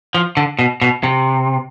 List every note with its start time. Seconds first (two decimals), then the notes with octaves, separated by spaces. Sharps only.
0.15 F3
0.37 D3
0.59 B2
0.82 B2
1.03 C3